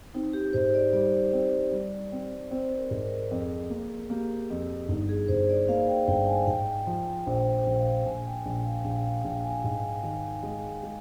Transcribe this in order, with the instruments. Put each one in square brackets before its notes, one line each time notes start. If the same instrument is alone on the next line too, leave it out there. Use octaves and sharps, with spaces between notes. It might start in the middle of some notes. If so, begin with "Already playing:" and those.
[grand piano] C4 [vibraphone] D#4
[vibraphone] G4
[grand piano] G#2 [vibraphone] C5
[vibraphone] D5
[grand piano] G3 [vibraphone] D5
[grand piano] C4
G3
C4
[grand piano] C4 [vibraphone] C5
[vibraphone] A#4
[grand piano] G#2
[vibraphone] A#4
[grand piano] F2 [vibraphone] G#4
[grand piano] A#3
[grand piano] A#3 [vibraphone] G4
[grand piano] F2
[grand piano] G1 [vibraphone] D#4
[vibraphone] G#4
[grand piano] G1 [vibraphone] C5
[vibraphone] D5
[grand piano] A#3 [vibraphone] F5
[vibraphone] G5
[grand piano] G1 [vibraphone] G5
[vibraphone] G#5
[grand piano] G#2 [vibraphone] G5
[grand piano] F3
[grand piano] A#1 [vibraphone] C5
[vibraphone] C5
[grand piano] A#1
[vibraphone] F5
[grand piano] A#1 [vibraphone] G#5
[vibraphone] G5
[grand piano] A#1 [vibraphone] G5
[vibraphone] F5
[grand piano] A#1 [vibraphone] F5
[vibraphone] F5
[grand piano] A#1 [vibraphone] G5
[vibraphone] G#5
[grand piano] G#2
D#3
G#3
G#3